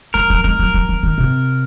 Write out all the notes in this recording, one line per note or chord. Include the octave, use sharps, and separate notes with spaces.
F3 A#4
F#3
G#3 A#4
F#3
F#3
F3
D#3
C3